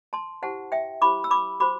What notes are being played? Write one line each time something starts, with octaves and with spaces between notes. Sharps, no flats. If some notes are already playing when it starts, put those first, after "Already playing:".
A5 C6
E4 G4 C5 F#5 A5
E5 G5
E4 G4 C5 B5 D6
E6
B5 D6
F#4 C5 B5 D6